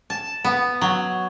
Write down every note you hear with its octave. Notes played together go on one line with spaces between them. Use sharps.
A5
B3
F#3